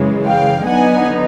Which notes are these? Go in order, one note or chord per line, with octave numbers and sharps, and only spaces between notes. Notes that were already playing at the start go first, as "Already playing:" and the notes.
Already playing: F#2 C#3 E3 G#3
F5 G5
D3 F#3 B3 D#4 F#5 G#5